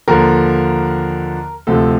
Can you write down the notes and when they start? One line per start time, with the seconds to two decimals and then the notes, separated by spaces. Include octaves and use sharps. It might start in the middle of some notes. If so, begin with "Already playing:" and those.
0.08 D#2 D3 F3 A#4
1.67 D2 C3 F3 A4